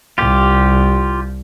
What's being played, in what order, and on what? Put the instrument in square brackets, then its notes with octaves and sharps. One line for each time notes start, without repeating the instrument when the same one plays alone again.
[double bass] C2 [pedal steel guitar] F4 G4